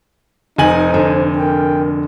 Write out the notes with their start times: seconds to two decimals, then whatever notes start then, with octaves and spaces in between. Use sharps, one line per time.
0.58 F1 D#4 C5 G#5 F#7
0.94 D3
1.37 A#4 G5